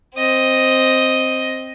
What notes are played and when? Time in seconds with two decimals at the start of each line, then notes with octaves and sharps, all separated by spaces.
0.15 C4 D#5